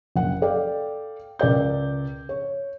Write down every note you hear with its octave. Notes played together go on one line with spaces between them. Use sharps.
F#1 F#5
A4 D5 F5 G5
C#2 A#4 D5 G6
C#5